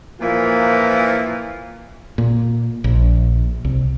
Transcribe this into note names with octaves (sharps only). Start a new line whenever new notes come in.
A#2 E3 F3 A#3 F4
A#2
A#1
C2